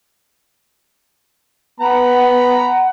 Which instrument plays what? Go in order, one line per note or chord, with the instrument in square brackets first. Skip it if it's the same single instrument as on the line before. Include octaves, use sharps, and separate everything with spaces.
[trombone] B3 [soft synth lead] F#5 [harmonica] A#5 B5